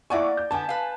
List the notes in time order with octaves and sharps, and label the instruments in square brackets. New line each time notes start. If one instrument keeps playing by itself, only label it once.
[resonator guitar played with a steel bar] A#3 D5 G#5 [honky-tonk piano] E4 F#5 C#6
[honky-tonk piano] G6
[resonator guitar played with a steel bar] D3 B3 [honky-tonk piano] G#5 A5
[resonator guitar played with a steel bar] B4 F5